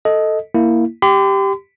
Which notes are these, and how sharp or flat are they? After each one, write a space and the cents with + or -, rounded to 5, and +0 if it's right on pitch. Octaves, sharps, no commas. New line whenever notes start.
A4 +0 D#5 +10
A#3 +0 E4 +0
G4 +0 C6 -45